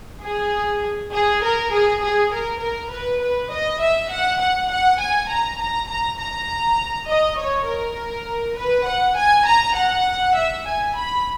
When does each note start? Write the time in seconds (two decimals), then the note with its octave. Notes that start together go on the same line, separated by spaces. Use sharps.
0.23 G#4
1.13 G#4
1.43 A#4
1.72 G#4
2.02 G#4
2.32 A#4
2.61 A#4
2.91 B4
3.21 B4
3.51 D#5
3.81 E5
4.10 F#5
4.41 F#5
4.70 F#5
5.01 G#5
5.29 A#5
5.60 A#5
5.89 A#5
6.20 A#5
7.08 D#5
7.39 C#5
7.67 A#4
8.57 B4
8.87 F#5
9.17 G#5
9.47 A#5
9.76 F#5
10.36 E5
10.66 G#5
10.96 B5